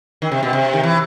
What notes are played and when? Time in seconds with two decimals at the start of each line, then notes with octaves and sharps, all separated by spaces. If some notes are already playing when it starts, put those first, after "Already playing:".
0.22 D#3
0.32 C3
0.43 B2
0.53 C3
0.73 D#3
0.83 E3